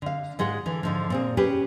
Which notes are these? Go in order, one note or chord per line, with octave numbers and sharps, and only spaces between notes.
D3 F5
G#2 G#3 F4 F#5
D3 E3
G#2 D3 F3
A#2 C4 G#4
C#4 G4 G#4 B4